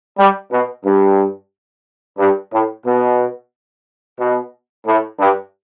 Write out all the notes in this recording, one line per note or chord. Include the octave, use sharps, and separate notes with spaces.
G3
B2
G2
G2
A2
B2
B2
A2
G2